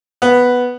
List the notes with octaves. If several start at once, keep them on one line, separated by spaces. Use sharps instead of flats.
B3